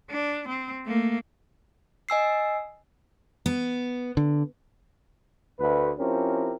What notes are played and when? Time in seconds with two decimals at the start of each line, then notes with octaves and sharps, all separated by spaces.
0.10 D4
0.48 C4
0.86 A3 A#3
2.09 D#5 G#5 E6 C7
3.46 B3
4.17 D3
5.59 D2 B4
5.99 F3 C4 C#4 E4 G4 A#4